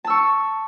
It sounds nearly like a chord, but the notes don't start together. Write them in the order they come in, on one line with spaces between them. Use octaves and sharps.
A5 E6 C#6